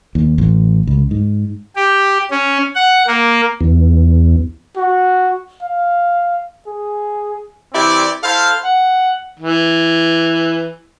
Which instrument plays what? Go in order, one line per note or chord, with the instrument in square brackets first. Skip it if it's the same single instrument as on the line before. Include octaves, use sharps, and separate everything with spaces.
[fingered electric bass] D#2
A1
C#2
G#2
[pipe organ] G4
C#4
F#5
A#3
[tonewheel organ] E2
[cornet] F#4
F5
G#4
[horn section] E3 C4 E4 G4 D5
E4 A4 C5 F5
[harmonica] F#5
E3